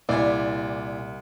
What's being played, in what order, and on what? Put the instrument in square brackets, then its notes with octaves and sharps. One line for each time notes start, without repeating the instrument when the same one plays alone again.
[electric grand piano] C2 [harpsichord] A#2 G#5 [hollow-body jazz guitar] E4 [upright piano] D5